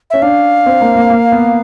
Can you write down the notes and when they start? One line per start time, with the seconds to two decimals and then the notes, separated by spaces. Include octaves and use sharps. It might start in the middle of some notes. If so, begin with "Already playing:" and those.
0.10 C#4 E5
0.22 D4 F5
0.66 C4
0.81 A#3
0.95 A#3
1.10 A#3
1.32 B3